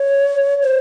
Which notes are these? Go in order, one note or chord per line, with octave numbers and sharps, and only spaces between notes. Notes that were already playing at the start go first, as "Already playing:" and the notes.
Already playing: C#5
C5